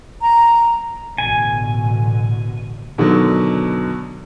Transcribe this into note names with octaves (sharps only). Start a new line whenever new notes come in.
A#5
A1 B2 D3 G#5
B2 D3 D#3 F#3